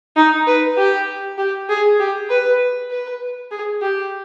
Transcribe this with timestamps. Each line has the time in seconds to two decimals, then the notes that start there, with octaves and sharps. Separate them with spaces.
0.16 D#4
0.47 B4
0.78 G4
1.38 G4
1.69 G#4
2.00 G4
2.30 B4
2.91 B4
3.51 G#4
3.82 G4